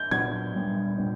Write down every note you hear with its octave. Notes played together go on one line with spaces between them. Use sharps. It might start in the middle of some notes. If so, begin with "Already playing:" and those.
Already playing: G6
A#2 F#3 B3 D4 G#6
A#2 G3 B3 D4
A#2 G3 B3 D4